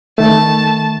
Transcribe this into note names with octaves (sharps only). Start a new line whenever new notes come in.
D#3 A3 A5